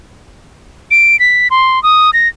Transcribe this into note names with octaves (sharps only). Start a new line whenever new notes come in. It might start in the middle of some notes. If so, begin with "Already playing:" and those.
D7
B6
C6
D#6
A#6